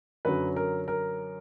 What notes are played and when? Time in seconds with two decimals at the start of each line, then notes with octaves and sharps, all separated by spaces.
0.25 F#2 D3 F#3 B4
0.56 A#4
0.88 A#4